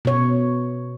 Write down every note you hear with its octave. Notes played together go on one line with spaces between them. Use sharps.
B2 C#5